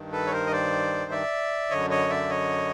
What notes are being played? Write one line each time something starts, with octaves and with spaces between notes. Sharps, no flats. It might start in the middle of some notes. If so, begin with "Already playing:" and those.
Already playing: G2 D#3
A4 B4
C#5
A#4 C5
D#5
C5 D5
D5 E5
F#2 D3 C#5 D#5
C#5 D#5
D5 E5
C#5 D#5